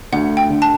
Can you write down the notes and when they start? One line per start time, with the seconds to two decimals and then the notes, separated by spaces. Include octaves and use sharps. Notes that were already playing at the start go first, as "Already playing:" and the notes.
0.12 D2 F#5
0.37 G5
0.50 D3
0.62 A5